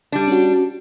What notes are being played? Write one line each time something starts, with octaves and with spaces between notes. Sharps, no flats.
G3 D4
C#4 F#4